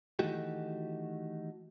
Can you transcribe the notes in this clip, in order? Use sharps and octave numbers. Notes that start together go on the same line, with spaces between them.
D#3 E3 A3 D#4 F#4 G4